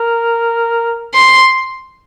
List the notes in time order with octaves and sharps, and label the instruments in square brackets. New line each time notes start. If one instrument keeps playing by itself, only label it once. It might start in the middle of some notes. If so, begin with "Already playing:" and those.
Already playing: [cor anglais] A#4
[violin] C6